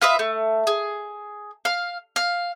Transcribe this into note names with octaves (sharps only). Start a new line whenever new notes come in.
F4 B4 D#5 E5
A3
G#4
F5
F5